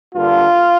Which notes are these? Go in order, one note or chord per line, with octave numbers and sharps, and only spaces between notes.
G2 D3 A#3 F4